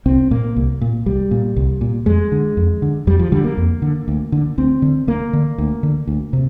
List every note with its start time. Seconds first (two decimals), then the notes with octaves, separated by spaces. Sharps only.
0.06 C2 C4
0.31 A#2 A#3
0.56 C2
0.81 A#2
1.06 C2 G3
1.31 A#2
1.56 C2
1.81 A#2
2.06 F2 G#3
2.32 D3
2.57 F2
2.82 D3
3.07 F2 G3
3.19 F3
3.32 D3 G3
3.44 A#3
3.57 F2
3.82 D3
4.08 D2
4.32 D3
4.58 D2 C4
4.82 D3
5.07 D2 A#3
5.33 D3
5.58 D2
5.83 D3
6.07 D2
6.33 C3